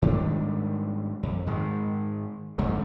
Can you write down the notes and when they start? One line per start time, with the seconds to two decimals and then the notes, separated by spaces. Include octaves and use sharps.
0.02 G#2 D#3 G3 D4
1.23 F2
1.46 G#2 D#3 G#3
2.58 F2 G#2 D3 D#3